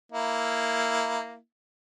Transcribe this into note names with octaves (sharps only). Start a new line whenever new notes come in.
A#3 E4